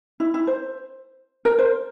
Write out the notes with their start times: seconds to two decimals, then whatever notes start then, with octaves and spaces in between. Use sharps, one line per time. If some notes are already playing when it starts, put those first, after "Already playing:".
0.20 E4
0.34 E4
0.47 C5
1.45 A#4
1.58 C5